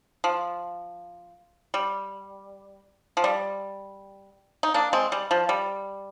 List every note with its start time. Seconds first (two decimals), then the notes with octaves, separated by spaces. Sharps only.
0.24 F3
1.74 G3
3.17 F3
3.24 G3
4.63 D#4
4.74 A#3 D4
4.93 G#3 C4
5.12 G3
5.31 F3
5.49 G3